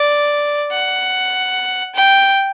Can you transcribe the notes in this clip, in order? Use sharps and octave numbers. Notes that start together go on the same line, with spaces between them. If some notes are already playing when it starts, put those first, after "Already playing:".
Already playing: D5
F#5
G5